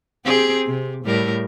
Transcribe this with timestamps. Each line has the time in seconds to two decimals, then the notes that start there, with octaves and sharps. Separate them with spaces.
0.25 C4 G4 G#4
0.66 C3
1.04 A2 G3 A#4